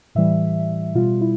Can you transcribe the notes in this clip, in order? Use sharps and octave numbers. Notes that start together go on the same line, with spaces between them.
A2 E3 G3 E5
B2 G3 F4
E4